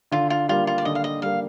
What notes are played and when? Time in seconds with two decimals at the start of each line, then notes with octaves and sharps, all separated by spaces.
0.12 D3 F4
0.30 F4
0.49 G3 A#3 F4
0.67 F4
0.78 D5
0.85 D3 D#5
0.95 F5
1.04 D#5
1.22 G3 A#3 F5